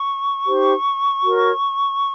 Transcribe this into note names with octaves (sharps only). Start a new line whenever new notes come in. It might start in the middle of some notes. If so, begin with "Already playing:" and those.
Already playing: C#6
D#4 G4 C5
F#4 A#4 C#5